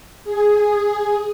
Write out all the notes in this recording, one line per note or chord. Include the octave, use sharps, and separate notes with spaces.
G#4